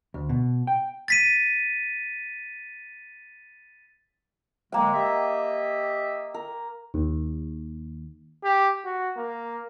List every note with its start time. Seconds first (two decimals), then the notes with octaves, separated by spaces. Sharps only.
0.14 D2
0.29 B2
0.67 G5
1.08 A6 B6 D#7
4.72 D3 F#3 G#3 A#3 G5
4.93 G4 D#5 E5
6.34 A#4
6.94 D#2
8.44 G4
8.85 F#4
9.17 A#3